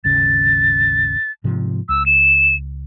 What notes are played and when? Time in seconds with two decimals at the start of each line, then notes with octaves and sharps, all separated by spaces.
0.04 G#1 D#2 C#3 A6
1.44 G#2 C3 F3
1.89 C#2 E6
2.06 E7